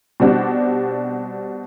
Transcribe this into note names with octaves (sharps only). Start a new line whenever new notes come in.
B2 G3 C4 D4 F#4